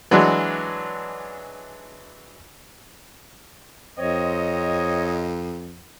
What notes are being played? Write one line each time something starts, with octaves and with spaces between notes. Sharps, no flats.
E3 F#3 G#3 D4
F2 C4 C#5 D#5